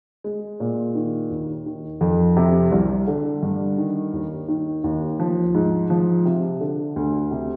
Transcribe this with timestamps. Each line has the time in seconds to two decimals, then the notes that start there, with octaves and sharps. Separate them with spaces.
0.24 G#3
0.60 A#2
0.95 D#3
1.31 D#2
1.66 D#3
2.01 F2
2.37 C3
2.72 C2
3.07 D3
3.43 G2
3.78 D#3
4.13 D#2
4.48 D#3
4.84 D#2
5.20 F3
5.54 G#2
5.90 F3
6.25 C3
6.61 D3
6.96 D2
7.31 C3